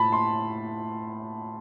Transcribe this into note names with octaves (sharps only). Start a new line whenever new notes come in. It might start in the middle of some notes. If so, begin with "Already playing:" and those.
Already playing: A2 A5 B5
C6